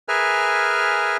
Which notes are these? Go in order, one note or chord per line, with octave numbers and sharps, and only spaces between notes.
G#4 A#4 B4 E5 G#5 F6